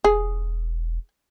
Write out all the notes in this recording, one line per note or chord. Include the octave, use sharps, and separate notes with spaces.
E1 G#4